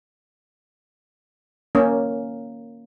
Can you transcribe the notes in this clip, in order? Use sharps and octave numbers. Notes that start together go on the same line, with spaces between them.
A#3 C#4